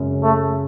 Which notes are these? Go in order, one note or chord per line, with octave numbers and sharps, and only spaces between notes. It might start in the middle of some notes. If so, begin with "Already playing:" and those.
Already playing: F#2 C#3 G#3 C#4
A3